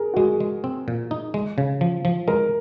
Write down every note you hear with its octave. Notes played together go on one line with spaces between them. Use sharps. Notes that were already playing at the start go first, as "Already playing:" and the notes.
Already playing: G#4 A#4
F#4
G#3 G#4
G#3
C4
A#2
D#4
G#3
C#3
F3
F3
G#3 A#4